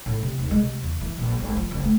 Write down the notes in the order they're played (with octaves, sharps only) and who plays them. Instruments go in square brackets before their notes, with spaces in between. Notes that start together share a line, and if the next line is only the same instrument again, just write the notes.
[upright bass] A2
C3
D#2
G#3
C3
E2
E3
A#1
G#1
F3
F#1
A3